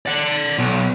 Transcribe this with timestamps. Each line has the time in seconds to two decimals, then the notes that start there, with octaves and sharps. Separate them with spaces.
0.06 D5 F#5
0.58 B1